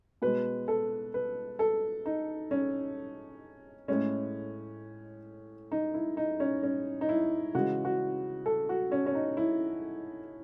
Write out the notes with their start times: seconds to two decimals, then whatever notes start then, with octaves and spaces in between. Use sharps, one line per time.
0.22 B2 G#3 B4
0.68 A4
1.14 B4
1.59 A4
2.06 D#4
2.51 C#4
3.88 A2 G#3 C#4
5.72 D#4
5.94 E4
6.17 D#4
6.40 C#4
6.63 C#4
7.01 D#4
7.09 E4
7.55 C#3 E3 G#3 F#4
7.85 F#4
8.46 A4
8.69 F#4
8.92 C#4
9.06 C#4
9.15 D#4
9.37 E4